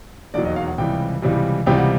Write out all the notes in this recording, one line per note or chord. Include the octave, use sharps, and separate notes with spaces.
E1 D#2 D#3 F#3 D5
D#5
F5
F#5
C#2 C3 E3 G3 G5
C#2 C3 E3 G3
C#2 C3 E3 G3 G5
F#5